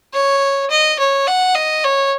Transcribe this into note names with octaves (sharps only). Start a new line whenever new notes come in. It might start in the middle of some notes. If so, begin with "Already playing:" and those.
C#5
D#5
C#5
F#5
D#5
C#5